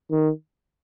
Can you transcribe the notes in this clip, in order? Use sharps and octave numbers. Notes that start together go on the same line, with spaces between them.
D#3